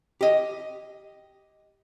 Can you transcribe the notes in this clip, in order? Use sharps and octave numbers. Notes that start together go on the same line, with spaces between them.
G4 D#5